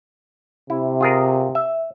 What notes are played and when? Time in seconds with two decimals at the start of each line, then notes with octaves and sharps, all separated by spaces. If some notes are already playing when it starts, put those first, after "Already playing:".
0.70 C3 E4
1.01 F4 G#4 A#4
1.55 E5